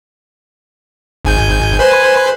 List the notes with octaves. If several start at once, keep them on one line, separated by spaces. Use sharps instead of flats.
G#1 G#5 G6
B4 C5 G#5